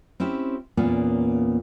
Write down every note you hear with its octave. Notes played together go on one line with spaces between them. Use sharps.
C4 C#4 E4 G4
E2 A#2 A#3 B3 C#4